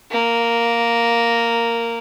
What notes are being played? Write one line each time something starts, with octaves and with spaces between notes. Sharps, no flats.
A#3